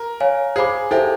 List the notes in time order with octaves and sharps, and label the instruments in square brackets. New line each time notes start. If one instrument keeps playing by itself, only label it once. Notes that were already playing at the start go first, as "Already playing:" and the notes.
Already playing: [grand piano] A#4
[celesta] C#5 F5 G#5
[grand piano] G#4 [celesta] C5 F5 G#5 B5 D6
[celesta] E4 A4 C5 E5 [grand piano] G4